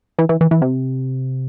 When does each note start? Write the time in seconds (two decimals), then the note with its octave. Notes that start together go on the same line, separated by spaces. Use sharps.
0.19 E3
0.29 E3
0.41 E3
0.51 E3
0.62 C3